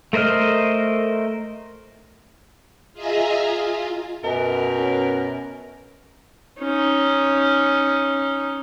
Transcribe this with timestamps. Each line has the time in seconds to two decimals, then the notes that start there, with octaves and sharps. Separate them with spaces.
0.13 A3 A#4 C5 D#5 F6
2.93 F4 G#4 D#5 E5 G#5 A#5
3.42 F4
4.24 F#2 B2 A#4 B4 D#5
4.79 C#4
6.59 C#4 D#4